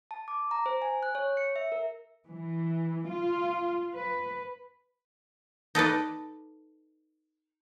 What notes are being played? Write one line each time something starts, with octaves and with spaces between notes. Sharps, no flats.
A5
D6
A#5
C5
G#5
F#6
C#5
C#7
E5
A#4
E3
F4
B4
D#4 A4 B4 D5